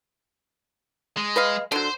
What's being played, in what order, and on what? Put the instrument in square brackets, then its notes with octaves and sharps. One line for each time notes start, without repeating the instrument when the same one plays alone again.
[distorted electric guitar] G#3
[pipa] B4 D#5 F5
[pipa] D3 F#3 [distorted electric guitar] C5